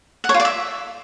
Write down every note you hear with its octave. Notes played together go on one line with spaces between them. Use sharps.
F#5
C#5
F4
D5
E5